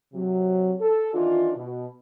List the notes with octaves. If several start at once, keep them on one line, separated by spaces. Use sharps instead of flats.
C3 F#3
A4
D#3 E3 D4 D#4 F4
B2